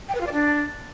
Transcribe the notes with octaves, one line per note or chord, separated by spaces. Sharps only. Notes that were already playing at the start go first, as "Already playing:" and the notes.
G5
B4
F4
D5
D4